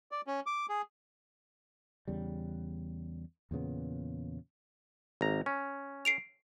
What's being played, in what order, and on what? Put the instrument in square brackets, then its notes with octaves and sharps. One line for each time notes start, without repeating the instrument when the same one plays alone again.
[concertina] D5
C#4
D6
G#4
[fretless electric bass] E2 C#3 G3
E2 A#2 C#3 B3
[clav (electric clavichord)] G#1 A#5
C#4
[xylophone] C7 D7 F7